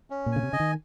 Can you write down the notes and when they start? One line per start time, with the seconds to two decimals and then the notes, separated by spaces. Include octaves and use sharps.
0.10 C#4
0.26 A#2
0.32 C#3 G#5
0.43 C3
0.53 C#3 D#5
0.60 D#3